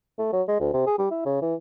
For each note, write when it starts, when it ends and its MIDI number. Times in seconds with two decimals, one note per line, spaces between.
0.19 0.33 57
0.33 0.42 54
0.48 0.58 56
0.60 0.70 38
0.74 0.86 48
0.87 0.96 68
0.98 1.08 55
1.11 1.21 64
1.25 1.39 49
1.42 1.55 52